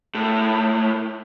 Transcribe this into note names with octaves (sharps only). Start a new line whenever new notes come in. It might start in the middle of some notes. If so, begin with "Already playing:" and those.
A2